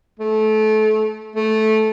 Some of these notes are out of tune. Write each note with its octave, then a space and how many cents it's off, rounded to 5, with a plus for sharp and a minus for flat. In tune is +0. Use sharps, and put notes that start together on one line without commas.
A3 -25
A3 -10